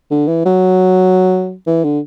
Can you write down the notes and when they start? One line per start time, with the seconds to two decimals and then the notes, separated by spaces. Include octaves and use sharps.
0.11 D3
0.28 E3
0.45 F#3
1.67 E3
1.84 D3